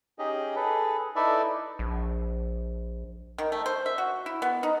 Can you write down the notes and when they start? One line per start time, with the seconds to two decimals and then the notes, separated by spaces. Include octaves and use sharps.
0.19 C#4 D#4 G4 G#4 D#5
0.55 G#4 A4 B4
1.16 D#4 E4 A4 B4 D5 E5
1.79 A#1
3.38 D#3
3.52 A3
3.66 C5
3.86 E5
3.98 F#4
4.26 E4
4.42 B3
4.63 D#4